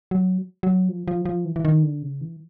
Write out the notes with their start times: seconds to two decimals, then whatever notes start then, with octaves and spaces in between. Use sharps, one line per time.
0.11 F#3
0.63 F#3
0.89 F3
1.08 F3
1.26 F3
1.45 E3
1.56 E3
1.65 D#3
1.83 D3
2.02 C#3
2.21 E3